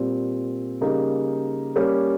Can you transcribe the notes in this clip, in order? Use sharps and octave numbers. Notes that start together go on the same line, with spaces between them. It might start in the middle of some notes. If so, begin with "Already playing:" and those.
Already playing: A#2 G3 C4
C#3 G3 A#3 D#4 G#4
G3 A#3 C#4 G4